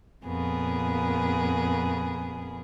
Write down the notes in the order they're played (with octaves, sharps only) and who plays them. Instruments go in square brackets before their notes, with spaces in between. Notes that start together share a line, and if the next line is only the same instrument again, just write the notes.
[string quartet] F2 A#2 B3 G#4 A#4